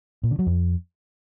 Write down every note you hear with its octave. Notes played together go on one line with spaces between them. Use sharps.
A#2
D3
F#3
F2